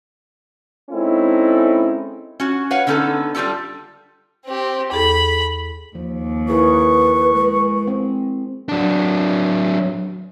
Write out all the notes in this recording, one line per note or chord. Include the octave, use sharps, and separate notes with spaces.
G#3 C4 C#4 D#4 E4 A4
C#4 F#4
B4 C#5 F5 F#5
D3 B3 C#4 D#4 A4
G3 D4 F4 G4 A4
C4 G4
E2 G#4 A4 B5
D#2 F3
E4 G#4 A#4 B4 C#6
G#3
C4
F#3 D4